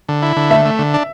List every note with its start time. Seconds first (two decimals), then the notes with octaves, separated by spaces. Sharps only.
0.09 D3
0.22 E4
0.36 D3
0.50 A3 E5
0.65 A3
0.79 D3
0.94 D4